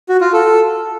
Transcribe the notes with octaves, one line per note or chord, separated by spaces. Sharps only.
F#4
F4
A4